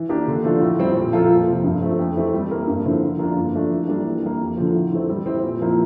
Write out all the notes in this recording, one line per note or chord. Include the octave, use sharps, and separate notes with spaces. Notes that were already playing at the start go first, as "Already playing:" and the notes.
Already playing: E3
A#3 D4 G4
D3
F3 A3 D4 F4
A2
G3 C4
A#2
F3 A#3 F4 A4
F2
C3 F3
G2
F3 A3 C4
F2
E3 A3 C4 G4
G3
A#3 E4 A#4
G2
D3 F3 C4 E4
F3
A#3 D4 F4
G2
F3 A3 D4
E3
G3 A#3 D4 A4
E3
G3 A#3
F2
D3 F3
A2
E3 A3 C4
G3
C4 E4
A#2
F3 A#3 E4